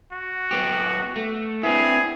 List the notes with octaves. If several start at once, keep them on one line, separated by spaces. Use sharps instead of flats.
F#4
F#2 B3 G4
A3
B3 C4 D4 E4 G#4